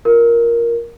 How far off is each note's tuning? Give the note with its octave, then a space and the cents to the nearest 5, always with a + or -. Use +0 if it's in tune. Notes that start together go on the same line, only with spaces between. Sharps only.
F4 +0 A#4 +5